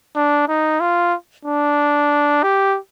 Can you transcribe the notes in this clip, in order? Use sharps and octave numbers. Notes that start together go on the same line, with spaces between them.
D4
D#4
F4
D4
G4